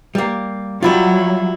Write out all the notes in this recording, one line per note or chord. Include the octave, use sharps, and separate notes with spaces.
G3 A#3
F#3 G3 E4 F4